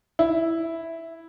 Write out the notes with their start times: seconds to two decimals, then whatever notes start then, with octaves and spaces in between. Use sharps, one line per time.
0.19 E4